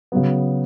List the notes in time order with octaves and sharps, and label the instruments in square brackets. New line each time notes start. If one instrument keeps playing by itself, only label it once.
[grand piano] C#3 F#3 B3